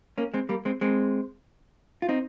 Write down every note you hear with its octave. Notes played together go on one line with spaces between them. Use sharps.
A#3 C#4
G#3 C4
G3 A#3
G#3 C4
G#3 C4
F4
C4 D#4